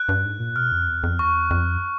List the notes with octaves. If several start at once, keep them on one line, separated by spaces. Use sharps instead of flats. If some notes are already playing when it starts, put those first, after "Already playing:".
Already playing: F#6
G2
G#2
A#2
B2 F6
F2
E2
F2
E2 C#6
F2